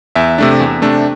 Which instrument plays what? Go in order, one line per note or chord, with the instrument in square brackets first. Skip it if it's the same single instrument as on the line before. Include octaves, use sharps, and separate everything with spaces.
[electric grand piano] E2 E5
C3 A3 D4
E2
C3 A3 D4